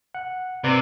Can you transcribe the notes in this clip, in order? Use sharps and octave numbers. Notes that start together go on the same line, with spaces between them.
F#5
C3 B4 C5 D5